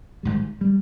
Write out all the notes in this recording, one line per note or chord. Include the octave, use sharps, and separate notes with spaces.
G#1 G#2 G3
G3